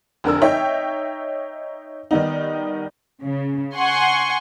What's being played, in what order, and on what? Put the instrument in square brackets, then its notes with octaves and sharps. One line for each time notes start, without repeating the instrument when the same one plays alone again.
[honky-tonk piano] F1 D3 A#4 E6
D#4 C#5 E5 G5
D#3 G3 B3 D#4
[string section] C#3
F#5 G#5 C6 C#6